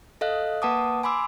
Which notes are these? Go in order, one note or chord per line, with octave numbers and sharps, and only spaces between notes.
A4 D#5 F5 F#6
A#3 B4 F#5 A5 D6 D#6
G#5 B5 C6 D6 E6